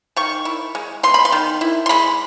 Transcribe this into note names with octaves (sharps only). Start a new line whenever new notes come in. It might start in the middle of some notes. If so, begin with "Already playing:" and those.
D#3 C#6
E4
G#3
B3 C6
B5
C6
D#3
E4
C6
G#3 B5